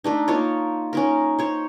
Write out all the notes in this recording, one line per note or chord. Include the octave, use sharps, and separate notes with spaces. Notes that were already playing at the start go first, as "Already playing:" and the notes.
A3 D4 D#4
A#3 D#4 F4 C#5
C#4 D#4 A#4
C5 C#5